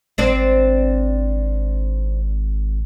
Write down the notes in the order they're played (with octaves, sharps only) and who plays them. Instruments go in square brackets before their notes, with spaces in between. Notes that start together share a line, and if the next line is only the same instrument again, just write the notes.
[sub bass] G#1 [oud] C4 D4 D5